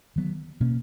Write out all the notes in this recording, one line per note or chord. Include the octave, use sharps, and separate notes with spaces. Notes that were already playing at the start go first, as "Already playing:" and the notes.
D#3 F#3 B3
B2 A#3 C#4